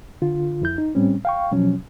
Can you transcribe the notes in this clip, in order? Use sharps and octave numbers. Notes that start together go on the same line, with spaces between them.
D3 F4
F2 E4 G6
D#4
A2 G3 C4 C#4
F5 G5 C#6
B2 F3 F#3 C#4